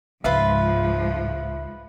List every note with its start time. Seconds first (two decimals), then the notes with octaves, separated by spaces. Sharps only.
0.24 C#2 G#2 F3 F4 B4 E5 F5